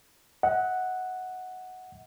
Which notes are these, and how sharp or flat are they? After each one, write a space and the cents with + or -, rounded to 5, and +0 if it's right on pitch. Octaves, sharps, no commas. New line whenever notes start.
D#5 +45 F#5 +0